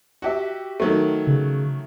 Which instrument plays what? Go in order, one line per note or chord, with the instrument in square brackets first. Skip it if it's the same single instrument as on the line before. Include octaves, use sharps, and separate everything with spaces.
[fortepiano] F#4 G4 E5
D#3 F#3 A3
[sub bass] C#3